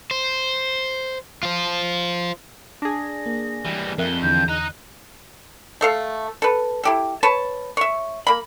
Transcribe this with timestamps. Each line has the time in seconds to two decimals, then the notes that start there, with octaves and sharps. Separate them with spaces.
0.11 C5
1.43 F4 C5
2.82 D4 G#4 A#6
3.26 A#3
3.65 E3 G3
3.98 F2 A#4 E5 F#6 G7
4.22 E2 D3 E3 G6
4.49 D#5 A#5 F#6
5.81 A3 A4 F5
6.42 A4 B4
6.83 E4 G4 A4
7.23 B4 C#5 A5
7.77 C#5 E5
8.27 A#3 B5